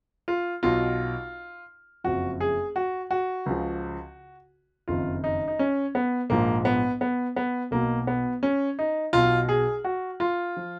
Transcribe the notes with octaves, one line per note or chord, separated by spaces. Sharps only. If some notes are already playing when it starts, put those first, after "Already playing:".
F4
B1 B2 F4
F#1 F2 F3 F#4
G#4
F#4
F#4
C#2 C#3 F3
F#1 F2 D#3 F4
D#4
D#4
C#4
B3
A#1 G#2 F3 A#3
B3
B3
B3
B1 B2 A#3
B3
C#4
D#4
B1 B2 F4
G#4
F#4
F4
F3